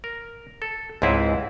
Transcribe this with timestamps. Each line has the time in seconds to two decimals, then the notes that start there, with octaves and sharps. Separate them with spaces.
0.04 A#4
0.62 A4
1.02 C#2 G#2 C4 E4 G#4 B4